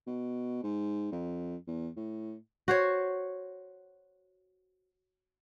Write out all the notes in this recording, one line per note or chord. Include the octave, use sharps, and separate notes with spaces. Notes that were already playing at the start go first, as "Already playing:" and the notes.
B2
G#2
F2
E2
A2
F#4 C5 C#5